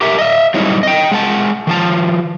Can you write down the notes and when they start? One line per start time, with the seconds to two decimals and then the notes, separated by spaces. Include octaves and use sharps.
0.01 G4 A#4 E5
0.18 D#5 E5
0.54 F#3 G3 C4 D#4 E4
0.83 D#5 G5
1.12 G#3 F#5 A5
1.67 D#3 F3 A5